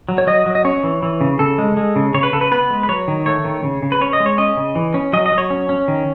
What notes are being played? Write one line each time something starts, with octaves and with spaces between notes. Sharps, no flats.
F#3
C#5
F#3 D#5
F#3
D#5
C#4 C#5
E3
E3
C#3
C#3 A4
G#3
G#3
C#3
C#3 C#5
B4
C#3 A4
B4
B3 B4
G#3
B4
F#3 C#5
D#3
A3 C#5
D#3
C#3
C#3
B4
C#4 C#5
D#5
G#3
C#5
C#4 D#5
C#3
E3
C#4
F#3 D#5
D#5
F#3
C#5
C#4
C#4
D#3